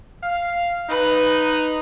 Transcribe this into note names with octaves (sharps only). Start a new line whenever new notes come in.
F5
D#4 B4